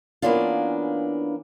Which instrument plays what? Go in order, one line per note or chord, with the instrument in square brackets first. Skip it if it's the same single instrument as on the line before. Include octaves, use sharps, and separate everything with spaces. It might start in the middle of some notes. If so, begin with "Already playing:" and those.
[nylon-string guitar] E3 A#3 B3 C#4 D4 F4